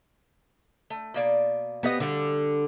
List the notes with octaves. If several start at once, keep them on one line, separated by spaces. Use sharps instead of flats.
A3
B2 A#3 D5
B3 G4 D#5
D3 G3